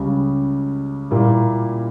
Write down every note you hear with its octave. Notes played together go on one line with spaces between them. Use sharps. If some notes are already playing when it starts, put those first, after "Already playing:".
Already playing: C#2 C#3 G3
A#2 G3 A#3 E4